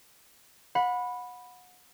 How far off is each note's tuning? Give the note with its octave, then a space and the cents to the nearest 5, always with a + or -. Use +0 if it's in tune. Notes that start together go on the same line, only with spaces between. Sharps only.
F#5 -30 B5 +0